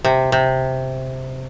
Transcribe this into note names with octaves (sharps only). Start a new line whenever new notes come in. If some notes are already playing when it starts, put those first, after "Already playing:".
C3
C3